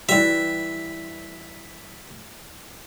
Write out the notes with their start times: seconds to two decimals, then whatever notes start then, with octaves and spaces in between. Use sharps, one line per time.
0.09 E3 G3 E5